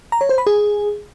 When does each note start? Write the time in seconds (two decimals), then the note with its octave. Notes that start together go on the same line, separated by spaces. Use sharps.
0.12 A#5
0.21 C#5
0.29 C5
0.38 B5
0.47 G#4